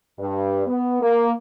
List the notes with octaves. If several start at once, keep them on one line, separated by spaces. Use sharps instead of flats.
G2
B3
A#3